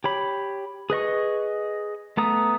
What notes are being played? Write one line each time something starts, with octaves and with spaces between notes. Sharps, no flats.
G4 C#5 B5
G#4 B4 D#5 C#6
A3 B3 A4 A#5 D#6